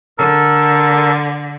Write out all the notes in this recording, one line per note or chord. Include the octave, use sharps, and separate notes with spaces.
D3 A4 A#4